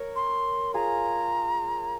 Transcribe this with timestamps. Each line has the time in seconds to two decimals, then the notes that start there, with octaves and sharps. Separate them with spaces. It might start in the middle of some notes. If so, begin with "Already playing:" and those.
Already playing: A#4 C#5
0.16 C6
0.74 F4 G#4 A#5